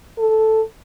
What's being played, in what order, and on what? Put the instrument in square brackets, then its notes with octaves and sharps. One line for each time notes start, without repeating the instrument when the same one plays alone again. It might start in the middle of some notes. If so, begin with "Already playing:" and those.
[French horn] A4